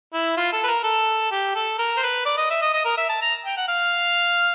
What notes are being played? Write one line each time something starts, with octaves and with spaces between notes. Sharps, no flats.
E4
F4
A4
B4
A#4
A4
G4
A4
A#4
C5
B4
D5
D#5
E5
D#5
D#5
A#4
E5
A5
A#5
G5
F#5
F5